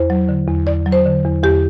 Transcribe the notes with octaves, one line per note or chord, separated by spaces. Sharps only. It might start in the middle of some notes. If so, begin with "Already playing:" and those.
Already playing: E2 C5
F#3
D3
E2
E2 D5
F#3
C5
D3
E2
E2 G4